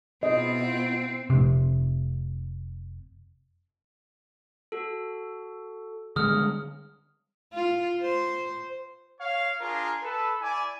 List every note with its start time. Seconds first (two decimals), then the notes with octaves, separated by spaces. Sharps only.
0.23 B2 C4 E4 F4 D#5
1.30 F1 C3
4.72 F#4 A4
6.16 D3 G3 G#3 G#4 D#6 F6
7.54 F4
8.02 C5
9.20 C#5 F5
9.60 D4 F4 G#4 A#4
10.03 A4 B4
10.42 E4 D5 G#5